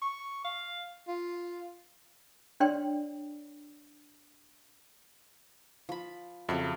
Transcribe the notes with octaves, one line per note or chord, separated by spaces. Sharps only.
C#6
F5
F4
D4 C#5 D5 G5 C6
F3 B5
F2 C#3 F#3 E5